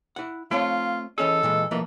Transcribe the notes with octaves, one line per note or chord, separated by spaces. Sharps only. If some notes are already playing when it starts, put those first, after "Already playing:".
E4 F#5
A3 C4 F4 C#5 F5
E3 C#4 G#4 A4 D#5
A#2 E3 G#3
E3 F3 A3 A#3